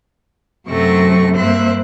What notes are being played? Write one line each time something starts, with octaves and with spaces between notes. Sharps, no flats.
F#2 C3 F#3 A3 C#6 A#6
G2 A#3 C4 C5 E5 F#6